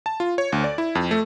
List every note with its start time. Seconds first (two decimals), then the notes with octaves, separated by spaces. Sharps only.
0.06 A5
0.20 F4
0.38 C#5
0.52 D2
0.64 D5
0.78 E4
0.95 F2
1.11 A3